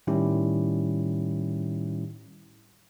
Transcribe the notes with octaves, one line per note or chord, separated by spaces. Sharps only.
A2 D#3 G3 C#4 E4 G4